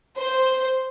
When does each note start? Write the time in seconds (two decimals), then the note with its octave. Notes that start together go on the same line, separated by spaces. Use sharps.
0.17 C5